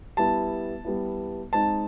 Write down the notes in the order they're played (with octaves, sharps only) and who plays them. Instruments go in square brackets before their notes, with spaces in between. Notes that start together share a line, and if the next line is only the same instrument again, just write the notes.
[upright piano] G3 B3 E4 [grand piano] A5
[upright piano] G3 B3 E4
[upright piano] G#3 C4 D#4 [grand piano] A5